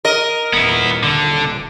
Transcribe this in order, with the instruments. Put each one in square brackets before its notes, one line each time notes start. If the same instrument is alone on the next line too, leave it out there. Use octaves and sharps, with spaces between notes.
[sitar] A#4 D#5
[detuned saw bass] D#1 [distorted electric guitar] B3 E4
[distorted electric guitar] D3